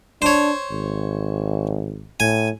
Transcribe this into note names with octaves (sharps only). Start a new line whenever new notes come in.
D4 C5 C#5
G#1
A2 G#5